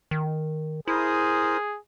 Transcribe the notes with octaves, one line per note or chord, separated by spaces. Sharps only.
D#3
E4 G#4 A#4 C5 D#6